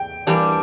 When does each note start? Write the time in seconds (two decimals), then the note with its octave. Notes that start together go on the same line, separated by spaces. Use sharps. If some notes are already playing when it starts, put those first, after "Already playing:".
Already playing: G5
0.27 E3 G3 A#3 D4 G4